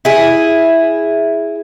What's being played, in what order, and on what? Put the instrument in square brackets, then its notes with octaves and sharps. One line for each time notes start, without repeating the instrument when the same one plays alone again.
[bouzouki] E4 G#4